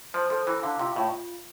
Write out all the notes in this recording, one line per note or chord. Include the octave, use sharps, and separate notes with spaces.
F3 C5
F3 A4
E3 E4
D3 F5
C3 F4
A2 F4